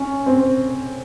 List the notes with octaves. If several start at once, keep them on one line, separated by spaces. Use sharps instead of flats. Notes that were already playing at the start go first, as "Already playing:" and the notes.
Already playing: C#4
C4